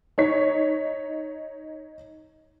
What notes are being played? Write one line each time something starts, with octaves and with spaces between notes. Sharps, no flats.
D#4 C#5 B6